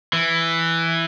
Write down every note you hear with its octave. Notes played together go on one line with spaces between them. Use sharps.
E3